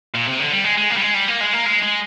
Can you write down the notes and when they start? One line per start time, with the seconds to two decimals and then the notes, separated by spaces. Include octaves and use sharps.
0.14 A#2
0.27 C3
0.39 D3
0.52 G3
0.64 G#3
0.77 G#3
0.90 A#3
0.97 G3
1.02 G#3
1.14 G3
1.28 A#3
1.40 G#3
1.53 A#3
1.65 G#3
1.82 G#3